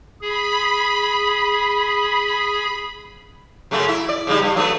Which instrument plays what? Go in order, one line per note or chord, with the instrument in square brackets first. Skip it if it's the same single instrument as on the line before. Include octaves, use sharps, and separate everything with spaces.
[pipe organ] G#4 [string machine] B5
[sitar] F#2 C#3 A3
E4
D5
C#3 G3 D#4
G2
F#3 A3 B3